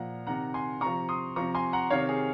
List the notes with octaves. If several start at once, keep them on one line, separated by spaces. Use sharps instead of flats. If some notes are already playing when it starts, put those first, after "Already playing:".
Already playing: A#2 F3 F#5 A#5
C3 D#3 F#5 A#5
G#5 C6
C3 F3 A#5 C#6
C6 D#6
C3 F3 A#5 C#6
G#5 C6
F#5 A#5
C3 D#3 C#5 F5
G#4